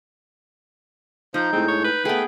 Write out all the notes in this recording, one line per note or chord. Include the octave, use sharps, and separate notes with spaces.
F3 D#4 G6
A2 G#3 C4
C#5
B4
A3 B3 G#4 G5